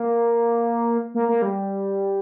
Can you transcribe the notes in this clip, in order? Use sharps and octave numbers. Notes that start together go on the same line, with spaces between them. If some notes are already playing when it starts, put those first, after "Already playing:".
Already playing: A#3
A#3
A#3
G3